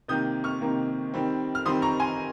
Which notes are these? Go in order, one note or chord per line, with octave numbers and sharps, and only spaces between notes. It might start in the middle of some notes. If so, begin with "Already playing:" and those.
C3 D#3 A#3 D#6 G6
C#6 F6
C3 D#3 A#3
D#3 G3 C4
F6
D#3 G3 C4 C6 D#6
A#5 C#6
G#5 C6